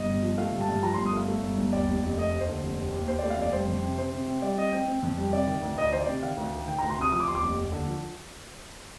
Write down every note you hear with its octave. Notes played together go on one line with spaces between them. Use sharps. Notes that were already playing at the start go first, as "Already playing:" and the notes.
Already playing: G1 D#5
G2
F3
A3 F5
G2
A5
G2
F3 A#5
G1 C6
D#6
A3 F5
A3
G1
G1
D#2 D5
F1
F1
A3 D#5
D#2
C5
D3
F1
D#2
D#2
D#2 C5
A3 D5
F5
F1 D5
G3 C5
F2
C3
C3 C5
C3
C4
G3 D5
C4 D#5
C4 G5
C4
F2
G3
C3 D5
D#3
D2
D2 D#5
D5
D#3 C5
D5
C3
D#3 F5
D2
D#3
D#3 G5
D2 A#5
C6
C3 D#6
F3 D#6
D6
D#2 C6
D6
F1
D#2
D3
F3